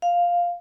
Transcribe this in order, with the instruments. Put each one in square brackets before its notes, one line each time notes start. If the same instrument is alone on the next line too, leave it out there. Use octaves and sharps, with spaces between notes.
[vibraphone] F5